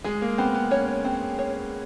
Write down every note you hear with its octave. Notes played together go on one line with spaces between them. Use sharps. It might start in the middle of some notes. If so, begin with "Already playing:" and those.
G#3 G#4
A#3
B3 C4
B3
C#4 C#5
C4
C#5